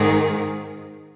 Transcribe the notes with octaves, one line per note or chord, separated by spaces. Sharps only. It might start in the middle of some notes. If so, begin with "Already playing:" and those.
Already playing: G#2 D#3 G#4